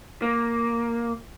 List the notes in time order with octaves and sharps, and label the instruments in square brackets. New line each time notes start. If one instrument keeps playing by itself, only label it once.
[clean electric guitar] A#3